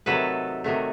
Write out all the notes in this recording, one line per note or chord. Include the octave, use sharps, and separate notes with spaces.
C3 D#3 F#3 A3 A4 B4
C3 D#3 F#3 A3